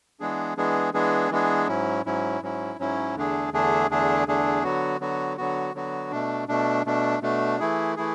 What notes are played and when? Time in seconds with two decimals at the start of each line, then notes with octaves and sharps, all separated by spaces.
0.20 E3 G#3 B3 D4 G#4
0.57 E3 G#3 B3 D4 G#4
0.94 E3 G#3 B3 D4 G#4
1.31 E3 G#3 B3 D4 G#4
1.68 G#2 F#3 C#4 E4
2.05 G#2 F#3 C#4 E4
2.42 G#2 F#3 C#4 E4
2.79 G#2 F#3 C#4 E4
3.16 E2 D3 A3 D4 G#4
3.53 E2 D3 A3 D4 G#4
3.90 E2 D3 A3 D4 G#4
4.27 E2 D3 A3 D4 G#4
4.64 D3 F#3 B3 F#4
5.00 D3 F#3 B3 F#4
5.37 D3 F#3 B3 F#4
5.75 D3 F#3 B3 F#4
6.12 B2 A3 D4
6.48 B2 A3 D4
6.86 B2 A3 D4
7.22 B2 A3 D4
7.60 E3 A3 E4 G#4
7.96 E3 A3 E4 G#4